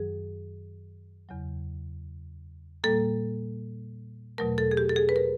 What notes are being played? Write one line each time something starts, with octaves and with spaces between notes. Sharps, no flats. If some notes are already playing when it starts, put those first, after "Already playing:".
Already playing: F#2 D#3 F#3 G#4
E2 C#3 F#3
A#2 G3 A#3 A4
E2 B2 F#3 A3 A#4
A4
G#4
G4
A4
G#4
B4
A#4